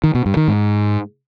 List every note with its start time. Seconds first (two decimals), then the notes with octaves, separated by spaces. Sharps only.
0.04 D#3
0.15 B2
0.26 G2
0.37 D#3
0.48 G#2